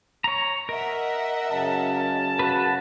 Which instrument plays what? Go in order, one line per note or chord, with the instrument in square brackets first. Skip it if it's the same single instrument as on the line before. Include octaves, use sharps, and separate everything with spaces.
[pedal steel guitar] C#5 A#5
[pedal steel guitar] A#4 [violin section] D#5 E5 F#5
[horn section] F#2 C#3 A5
[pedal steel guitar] F#4 B4